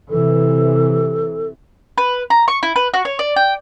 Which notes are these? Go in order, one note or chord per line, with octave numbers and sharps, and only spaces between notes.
C3 E3 A4
B4
A#5
C#6
E4
B4
F#4
C#5
D5
G5